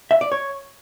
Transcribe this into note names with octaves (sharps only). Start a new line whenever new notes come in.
E5
D5
C#5